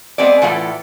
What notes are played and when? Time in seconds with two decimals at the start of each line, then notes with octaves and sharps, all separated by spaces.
0.18 G#3 B3 C4 G#4 D5
0.42 A2 E3 F4 A4 B4 F#5